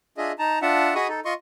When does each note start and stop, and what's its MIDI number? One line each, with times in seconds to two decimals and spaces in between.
0.18 0.32 62
0.18 0.32 65
0.18 0.32 68
0.18 0.32 75
0.18 0.32 76
0.39 0.59 63
0.39 0.59 81
0.39 0.59 82
0.62 0.94 62
0.62 0.94 65
0.62 0.94 76
0.62 0.94 78
0.62 0.94 81
0.95 1.07 66
0.95 1.07 68
0.95 1.07 75
0.95 1.07 83
0.95 1.07 85
0.95 1.07 87
1.08 1.20 63
1.08 1.20 69
1.25 1.34 65
1.25 1.34 75
1.25 1.34 84
1.25 1.34 85